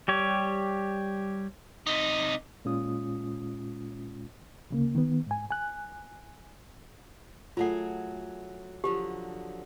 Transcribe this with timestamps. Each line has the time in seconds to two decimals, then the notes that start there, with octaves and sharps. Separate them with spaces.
0.08 G3 G4 C#5
1.87 C3 D#4
2.65 A#2 G#3 C#4 F4 D#6
4.70 D2 C#3 A#3
4.95 D#3 B3
5.27 G#2 G#5
5.51 G#5 F#6
7.57 F#3 A3 F4 G#4 F#5
8.84 D3 F3 F#3 G4